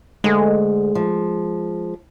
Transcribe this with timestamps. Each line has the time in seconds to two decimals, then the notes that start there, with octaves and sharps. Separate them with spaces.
0.24 D2 G#3
0.95 F3